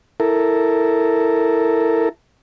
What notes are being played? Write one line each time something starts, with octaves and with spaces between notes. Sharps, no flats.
E4 A4 A#4